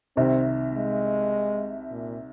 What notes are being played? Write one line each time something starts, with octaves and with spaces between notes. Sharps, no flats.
C2 C3 D#3 C4
G#3
A#2